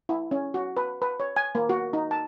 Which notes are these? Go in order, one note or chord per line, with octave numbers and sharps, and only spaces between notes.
E4
C#4
F#4
B4
B4
C#5
G#5
A#3
F#4
D#4
A5